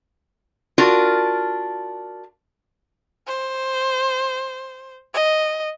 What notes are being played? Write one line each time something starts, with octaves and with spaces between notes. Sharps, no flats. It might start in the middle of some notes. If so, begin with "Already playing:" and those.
D4 F4 F#4 A#4
C5
D#5